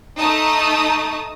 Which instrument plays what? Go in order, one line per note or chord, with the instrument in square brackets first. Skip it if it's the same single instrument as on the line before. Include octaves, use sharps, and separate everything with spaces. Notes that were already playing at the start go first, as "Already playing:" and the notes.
[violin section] A3 D#4 A5 D#6